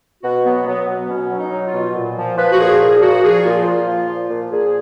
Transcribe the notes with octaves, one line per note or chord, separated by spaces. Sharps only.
B2 F#4
F#3 B3
F#3 B3
B2 B3
B2 C#4
F#3
D#4
F#3
F4
B2
A#2
F3
F3 B4
F#4
A#2 G#4
A#2 G#4
F3 F#4
F3 G#4
A#2 F4
A#2
F3
F3
A#2
A#2 G#4